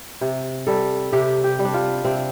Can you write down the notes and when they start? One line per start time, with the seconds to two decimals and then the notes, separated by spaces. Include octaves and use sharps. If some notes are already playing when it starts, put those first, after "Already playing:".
0.21 C3
0.67 G3 A4
1.13 C3 G4
1.44 G4
1.59 G3
1.65 D4
1.74 F4
2.05 C3 C4